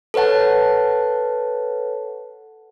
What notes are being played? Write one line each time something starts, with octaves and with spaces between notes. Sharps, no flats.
A4 B4 C#5 F#5 A5